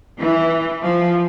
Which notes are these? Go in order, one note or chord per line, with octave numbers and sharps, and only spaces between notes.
E3
F3